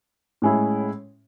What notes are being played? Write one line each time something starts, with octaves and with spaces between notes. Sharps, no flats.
A2 G#3 C#4 E4